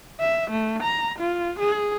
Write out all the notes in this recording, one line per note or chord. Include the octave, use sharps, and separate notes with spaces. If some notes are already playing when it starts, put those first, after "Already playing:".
E5
A3
A#5
F4
G#4